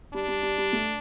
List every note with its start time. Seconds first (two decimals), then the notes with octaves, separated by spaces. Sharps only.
0.14 G3 D4
0.28 G3
0.43 G3
0.58 G3
0.73 A3